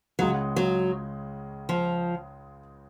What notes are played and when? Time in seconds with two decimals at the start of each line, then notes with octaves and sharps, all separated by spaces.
0.19 C#2 C#3 F#3 G#3
0.56 F#3
1.69 F3